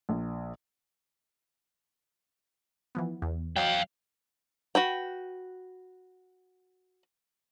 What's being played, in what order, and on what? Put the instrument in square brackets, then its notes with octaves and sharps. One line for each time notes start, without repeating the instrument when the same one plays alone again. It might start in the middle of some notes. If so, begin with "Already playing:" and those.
[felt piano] A#1
[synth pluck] E3 F3 B3
E2
[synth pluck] F#3 [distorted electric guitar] F5 G5
[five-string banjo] F#4 B4 G5